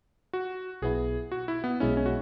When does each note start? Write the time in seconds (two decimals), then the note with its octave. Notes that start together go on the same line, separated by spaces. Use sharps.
0.33 F#4
0.82 B1 B2 B3 E4 G#4
1.32 F#4
1.48 E4
1.64 B3
1.80 B1 B2 G#3 C#4 E4
1.97 C#4
2.06 F#4